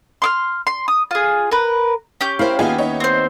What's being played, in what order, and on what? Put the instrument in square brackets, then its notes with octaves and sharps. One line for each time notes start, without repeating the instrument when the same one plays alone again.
[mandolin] C6 D6 F6
C6
D#6
F4 G#4
A#4 B4
C#4 G4 G6
[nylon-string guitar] E4 C5 [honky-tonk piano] A#4 F5
[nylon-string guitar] D#2 B3 E5 [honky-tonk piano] D#4 F4 G#4
[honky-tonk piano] D#4 C#5
[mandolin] C4 C5